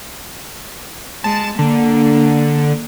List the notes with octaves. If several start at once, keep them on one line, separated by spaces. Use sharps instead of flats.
G#3 A5
D3 A#3